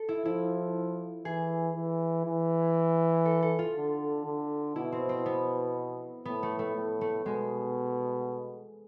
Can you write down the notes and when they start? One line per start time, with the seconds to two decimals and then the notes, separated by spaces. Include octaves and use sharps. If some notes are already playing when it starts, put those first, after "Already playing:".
Already playing: A4
0.09 E4
0.25 F3 E4
1.25 E3 G#4
1.76 E3
2.25 E3
3.25 A4
3.43 A4
3.59 F4
3.76 D3
4.26 D3
4.76 B2 E4
4.92 C4
5.09 C4
5.26 B3
6.25 A2 B3
6.43 A3
6.59 A3
6.76 A2
7.01 A3
7.25 B2 G#3